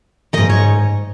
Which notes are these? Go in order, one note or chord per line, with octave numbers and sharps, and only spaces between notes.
G#2 D#3 D#5
C#5